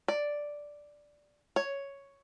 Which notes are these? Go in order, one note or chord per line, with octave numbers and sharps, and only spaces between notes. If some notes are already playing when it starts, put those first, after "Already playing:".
D5
C#5